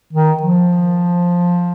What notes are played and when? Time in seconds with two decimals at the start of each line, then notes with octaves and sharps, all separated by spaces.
0.13 D#3
0.43 F3